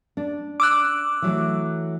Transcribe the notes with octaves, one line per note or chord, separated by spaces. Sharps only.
D4
D6 E6 F#6
E3 F#3 A3